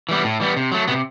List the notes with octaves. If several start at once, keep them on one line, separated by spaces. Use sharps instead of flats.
E3 G3 B3
A2
E3 G3 B3
C3
F#3 A3
C3 B3